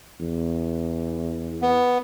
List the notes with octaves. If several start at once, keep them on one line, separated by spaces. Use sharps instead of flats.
E2
B3